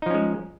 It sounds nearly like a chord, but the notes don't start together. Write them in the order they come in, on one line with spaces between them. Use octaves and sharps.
D#4 F3 C#4 G#3